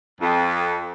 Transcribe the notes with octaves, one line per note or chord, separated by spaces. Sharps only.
F2